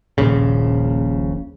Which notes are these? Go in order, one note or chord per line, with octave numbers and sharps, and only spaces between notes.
D#1 A#1 C#3